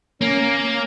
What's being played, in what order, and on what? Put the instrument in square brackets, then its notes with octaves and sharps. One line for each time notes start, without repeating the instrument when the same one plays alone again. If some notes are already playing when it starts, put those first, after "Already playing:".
[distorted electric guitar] A#3 [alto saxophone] C#4